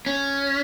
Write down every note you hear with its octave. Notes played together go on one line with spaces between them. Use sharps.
C#4